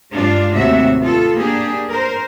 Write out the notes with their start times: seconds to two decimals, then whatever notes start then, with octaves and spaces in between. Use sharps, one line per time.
0.14 G2 G#3 D4 F4
0.55 D#2 A2 C3 F#4 E5
1.00 B3 F4 A4
1.37 A#3 D4 G4 G#4
1.89 A#4 C5